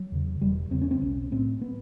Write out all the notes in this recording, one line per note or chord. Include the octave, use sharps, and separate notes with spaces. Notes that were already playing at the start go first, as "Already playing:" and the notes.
Already playing: F#3
E2 C#3
E1 G3
E2 C#3 C4
C#4
C4
B1 C#4
A2 C4
B3